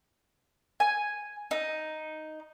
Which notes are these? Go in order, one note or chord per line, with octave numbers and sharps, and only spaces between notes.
G#5
D#4